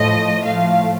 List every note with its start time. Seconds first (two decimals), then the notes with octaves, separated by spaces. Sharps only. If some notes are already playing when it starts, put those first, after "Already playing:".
Already playing: A2 F3 A3 D#5
0.43 A2 F3 A3 F5